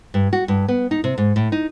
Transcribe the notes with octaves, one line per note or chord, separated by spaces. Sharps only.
G2
F#4
G2
B3
D#4
C3
G#2
A2
D#4